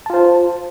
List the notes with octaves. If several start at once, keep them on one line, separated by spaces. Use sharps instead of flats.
F4 C5 A5